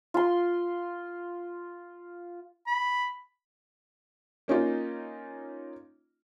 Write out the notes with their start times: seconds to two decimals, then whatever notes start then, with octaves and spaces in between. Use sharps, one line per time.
0.14 F4 C6
2.67 B5
4.48 A#3 C#4 D#4 F4